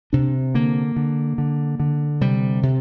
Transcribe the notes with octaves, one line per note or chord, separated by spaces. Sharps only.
C3 D4
D3 A#3
D3
D3
D3
C3 G3
C3